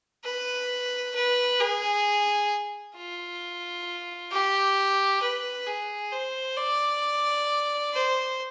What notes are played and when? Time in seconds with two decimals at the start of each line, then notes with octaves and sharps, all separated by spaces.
0.25 B4
1.15 B4
1.60 G#4
2.97 F4
4.32 G4
5.22 B4
5.67 G#4
6.12 C5
6.57 D5
7.94 C5